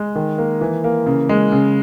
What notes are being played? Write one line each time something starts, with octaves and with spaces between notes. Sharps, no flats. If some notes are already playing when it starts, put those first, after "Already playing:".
Already playing: G#3
D#3
A#3
E3
A#3
C#3
G#3
C#3